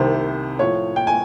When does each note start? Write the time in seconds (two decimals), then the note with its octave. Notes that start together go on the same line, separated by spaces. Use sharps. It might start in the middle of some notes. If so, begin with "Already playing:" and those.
Already playing: C2 C3 D#3 C5
0.59 A2 F3 C#5
0.96 G5
1.07 G#5